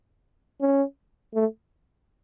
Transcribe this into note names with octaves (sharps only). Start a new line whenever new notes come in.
C#4
A3